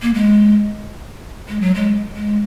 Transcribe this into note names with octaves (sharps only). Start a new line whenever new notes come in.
A#3
G#3
G#3
F#3
G#3
G#3